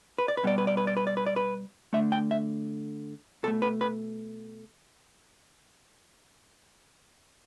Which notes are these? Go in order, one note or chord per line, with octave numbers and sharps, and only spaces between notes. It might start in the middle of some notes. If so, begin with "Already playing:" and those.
B4
D5
B4
B2 G3 B3 D5
B4
D5
B4
D5
B4
D5
B4
D5
B4
D3 A3 E5
G5
E5
B2 A3 A4
B4
B4